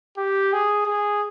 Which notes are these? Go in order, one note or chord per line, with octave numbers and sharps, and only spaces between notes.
G4
G#4
G#4